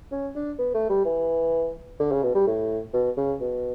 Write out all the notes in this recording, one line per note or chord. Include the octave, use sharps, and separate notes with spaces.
C#4
D4
B3
A3
G3
E3
D3
C#3
B2
G3
A2
B2
C#3
B2